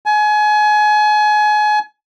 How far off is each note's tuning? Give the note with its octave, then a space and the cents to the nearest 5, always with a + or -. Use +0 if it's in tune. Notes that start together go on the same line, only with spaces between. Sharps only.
G#5 +30